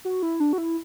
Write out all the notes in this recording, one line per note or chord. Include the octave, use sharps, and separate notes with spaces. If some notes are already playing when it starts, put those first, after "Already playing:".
F#4
E4
D4
F#4
E4